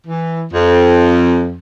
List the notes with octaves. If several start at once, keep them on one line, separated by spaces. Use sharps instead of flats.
E3
F2